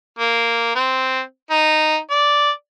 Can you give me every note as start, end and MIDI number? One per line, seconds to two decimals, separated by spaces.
0.19 0.71 58
0.75 1.20 60
1.50 1.96 63
2.11 2.51 74